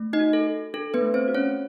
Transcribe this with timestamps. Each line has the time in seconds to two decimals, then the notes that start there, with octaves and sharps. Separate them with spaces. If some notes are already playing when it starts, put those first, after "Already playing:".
Already playing: A3
0.13 D#4 D#5
0.20 F#4
0.33 A4
0.47 A4
0.74 D4 A4
0.94 B3 B4
1.01 A3
1.14 C4 C5
1.28 F#4
1.35 C#4 C#5